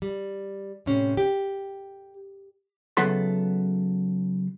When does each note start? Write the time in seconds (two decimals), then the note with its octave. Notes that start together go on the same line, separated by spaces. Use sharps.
0.02 G3
0.86 A2 C3 C#4
1.17 G4
2.97 C#3 F#3 B3 E4 A4 C6